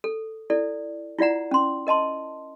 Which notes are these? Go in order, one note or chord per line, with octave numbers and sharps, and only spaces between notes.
A4
E4 A4 D5
E4 F4 D5 F#5 A#5
C#4 C6
A#4 D#5 A5 C6